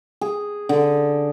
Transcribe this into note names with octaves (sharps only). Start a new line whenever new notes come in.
G#4
D3